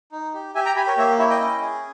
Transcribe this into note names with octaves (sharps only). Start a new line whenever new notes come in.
D#4
G4
G4 E5 G#5
G5 A#5
G4 G#5 B5
A#4 C#5
A#3 C#5 E5
E4 C#5 E5
D#5 G5
C#4
G#4